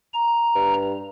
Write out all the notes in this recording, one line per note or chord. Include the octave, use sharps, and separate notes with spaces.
A#5
G2